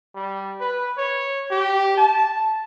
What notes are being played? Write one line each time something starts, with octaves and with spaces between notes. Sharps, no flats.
G3
B4
C#5
G4
A5